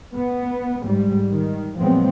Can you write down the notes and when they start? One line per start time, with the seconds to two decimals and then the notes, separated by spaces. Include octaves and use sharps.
0.14 B3
0.83 G#2 G3
1.31 D#3
1.78 A#2 F3 F#3 G#3 B3 C4